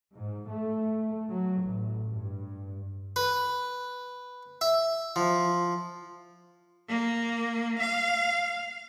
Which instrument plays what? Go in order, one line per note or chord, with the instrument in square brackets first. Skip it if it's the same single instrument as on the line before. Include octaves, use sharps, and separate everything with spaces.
[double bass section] G#2
A3
F#3
A1
G2
[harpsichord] B4
E5
F3
[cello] A#3
F5